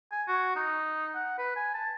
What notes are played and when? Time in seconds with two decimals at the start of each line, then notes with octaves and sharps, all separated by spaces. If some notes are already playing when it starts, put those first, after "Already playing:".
0.12 G#5
0.28 F#4
0.56 D#4
1.15 F#5
1.38 B4
1.56 G#5
1.74 A5